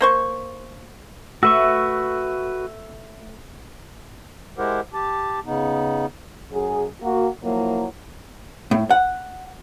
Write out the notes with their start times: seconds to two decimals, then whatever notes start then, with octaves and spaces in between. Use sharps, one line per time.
0.01 A#3 C5 C#6
1.43 A3 F#4 B4 C#6 E6
4.58 G#3 E4 G4 A#4 C5 F#5
4.93 G4 A5
5.46 C#3 B3 D#4
6.51 F#2 G#4
7.01 A#3 F#4
7.43 F3 F#3 A#3 E4
8.71 A2
8.91 F#5